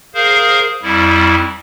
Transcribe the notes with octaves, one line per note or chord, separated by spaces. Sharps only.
G#4 A#4 C5 F5
F2 G3 E4